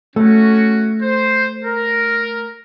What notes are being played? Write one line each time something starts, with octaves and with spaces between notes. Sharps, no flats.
A3 C#4 F#4
C5
A#4